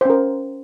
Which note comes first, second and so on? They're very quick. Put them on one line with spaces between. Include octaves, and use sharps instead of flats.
C5 C#4 A#4